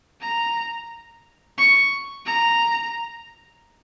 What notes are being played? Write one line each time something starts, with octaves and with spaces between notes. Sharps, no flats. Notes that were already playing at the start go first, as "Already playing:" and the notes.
A#5
C#6
A#5